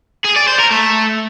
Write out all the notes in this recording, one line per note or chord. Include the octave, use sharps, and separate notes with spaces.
G#4
D5
C5
A#4
A3